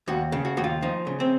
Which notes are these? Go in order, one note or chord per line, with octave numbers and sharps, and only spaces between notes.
D#2 F#4
C#3
F#4
D#2 F#4
F4
F3 D#4
C#3
C4